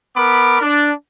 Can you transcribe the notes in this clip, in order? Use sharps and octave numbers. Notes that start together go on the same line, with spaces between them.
B3 A#4 B5 D6
D4